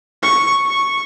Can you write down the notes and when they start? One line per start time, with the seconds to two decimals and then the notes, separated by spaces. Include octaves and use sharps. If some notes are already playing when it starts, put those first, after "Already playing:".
0.23 C#6
0.66 C#6